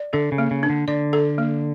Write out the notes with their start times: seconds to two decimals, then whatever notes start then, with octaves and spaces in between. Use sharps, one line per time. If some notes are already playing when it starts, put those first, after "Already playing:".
Already playing: D5
0.13 D3 A4
0.32 C#3
0.38 A#3
0.51 C#3
0.63 D4
0.70 D3
0.88 D3 D5
1.13 A4
1.38 A#3